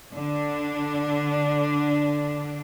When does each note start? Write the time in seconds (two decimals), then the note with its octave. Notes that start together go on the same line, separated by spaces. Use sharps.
0.13 D3 D4